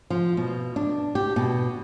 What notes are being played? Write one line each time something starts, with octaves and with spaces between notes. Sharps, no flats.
F3
B2
D4
G4
B2